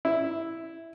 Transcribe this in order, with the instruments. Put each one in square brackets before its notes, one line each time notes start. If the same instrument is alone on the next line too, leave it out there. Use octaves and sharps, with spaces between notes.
[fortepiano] E4